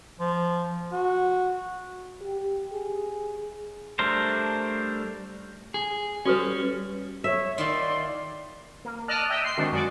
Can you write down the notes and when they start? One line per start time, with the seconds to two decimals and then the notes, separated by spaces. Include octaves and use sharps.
0.20 F3
0.93 F#4
2.21 G4
2.72 G#4
3.99 G3 A3 D4 A#4 C5
5.74 G#4
6.26 G3 C#4 F#4 A4 B4
7.24 C#5 E5
7.58 D#3 E4 F4 D5 C6
8.85 A#3
9.08 D5 D#5 A5 F6 F#6
9.29 D#5 E5 G5 E6
9.44 C6 C7
9.58 D#3 G#3 C4 D4 F#4
9.72 F#2 G#3 F#4 D5 D6